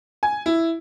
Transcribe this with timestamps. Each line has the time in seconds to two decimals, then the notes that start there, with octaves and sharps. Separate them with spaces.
0.23 G#5
0.46 E4